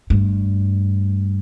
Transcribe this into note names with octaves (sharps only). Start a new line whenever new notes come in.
G2 A3